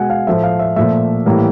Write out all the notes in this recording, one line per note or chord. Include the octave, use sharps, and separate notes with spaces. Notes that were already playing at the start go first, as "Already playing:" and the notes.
Already playing: B2 G#3 F#5 G#5
F5
A2 F3 A3 E5
F5
E5
A#2 F3 A3 E5
A2 E3 G3 A#3